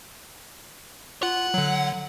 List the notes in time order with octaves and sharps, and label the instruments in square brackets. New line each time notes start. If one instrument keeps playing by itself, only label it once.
[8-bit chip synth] F4 [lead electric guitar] F#5
[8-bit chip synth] D3 F#3